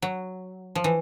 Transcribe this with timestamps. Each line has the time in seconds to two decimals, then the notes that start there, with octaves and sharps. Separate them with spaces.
0.02 F#3
0.75 F3
0.84 E3